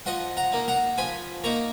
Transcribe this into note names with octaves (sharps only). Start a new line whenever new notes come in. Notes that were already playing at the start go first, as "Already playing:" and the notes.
F3 D#5 F#5
F#5 A#5
A#3 D#4
F#5 A#5
F3 G#5 B5
A#3 D#4 A#5 C#6